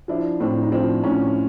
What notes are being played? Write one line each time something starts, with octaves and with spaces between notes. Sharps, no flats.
F3 D4 E4
A2 C4 D4
D#4
F3 C4 D4
A2 C#4 D#4